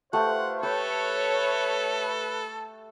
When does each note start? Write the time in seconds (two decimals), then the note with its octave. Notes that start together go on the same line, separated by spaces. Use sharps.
0.13 A3 F4 G4 B4 C5 F#5
0.63 G4 A4 B4 C#5 G5